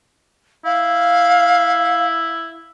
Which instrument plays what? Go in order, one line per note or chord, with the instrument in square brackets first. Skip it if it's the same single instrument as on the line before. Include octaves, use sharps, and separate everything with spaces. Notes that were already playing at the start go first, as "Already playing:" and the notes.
[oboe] E4 [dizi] F5